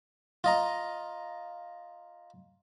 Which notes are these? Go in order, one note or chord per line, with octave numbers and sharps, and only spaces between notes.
F4 D#5 A#5